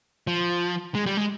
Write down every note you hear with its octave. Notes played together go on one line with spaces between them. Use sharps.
F3
G#3
G3
G#3